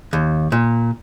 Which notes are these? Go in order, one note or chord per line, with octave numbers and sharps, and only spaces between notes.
D#2
A#2